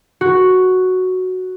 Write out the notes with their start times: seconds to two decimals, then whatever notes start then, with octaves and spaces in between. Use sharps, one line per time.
0.21 F#4